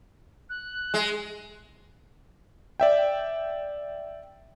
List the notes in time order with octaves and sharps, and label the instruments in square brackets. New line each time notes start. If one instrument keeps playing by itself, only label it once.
[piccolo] F#6
[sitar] G#3
[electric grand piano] D5 E5 G5